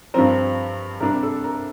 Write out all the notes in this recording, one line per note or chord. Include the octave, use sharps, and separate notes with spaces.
G2 F3 C4 A#4
C3 G3 D4 A#4
A4
A#4